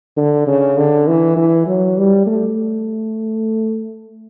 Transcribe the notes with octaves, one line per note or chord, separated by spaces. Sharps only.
D3
C#3
D3
E3
E3
F#3
G3
A3